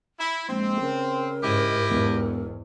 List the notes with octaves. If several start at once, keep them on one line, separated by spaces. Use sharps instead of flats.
E4
A#1 G#3 C4
C#3 A#4
G#2 E4 G4 D#5
E1 E2 G#2